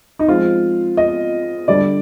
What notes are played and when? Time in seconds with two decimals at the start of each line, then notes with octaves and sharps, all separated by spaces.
0.19 D#4
0.28 F3 G#3 C4 F4
0.97 D#5
1.68 D3 G3 D4 D5